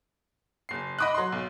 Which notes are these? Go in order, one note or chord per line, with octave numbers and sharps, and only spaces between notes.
F#1 C7
D#5 B5 D6 D#6 F#6
F#3 C6
B1